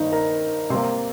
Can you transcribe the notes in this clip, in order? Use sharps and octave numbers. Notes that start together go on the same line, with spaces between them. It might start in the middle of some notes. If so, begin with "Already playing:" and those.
Already playing: G2 D#3 A#3 D#4 C5 D#5
A#4 A#5
C3 G3 A#3 C5 C6